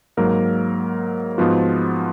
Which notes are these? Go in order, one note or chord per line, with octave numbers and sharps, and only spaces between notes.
G#2 F#3 A#3 A#4
G#2 F3 B3 F4 F#4